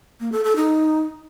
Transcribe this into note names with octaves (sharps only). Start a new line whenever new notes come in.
A#3
A4
A4
D#4